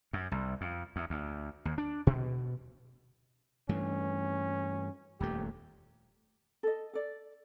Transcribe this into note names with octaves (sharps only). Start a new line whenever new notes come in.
F#2
C2
F2
E2
D2
D#2
D4
B2
G2 E3 A3 C#4
D#1 F2 A3 G4
A4 D#5
A4 D5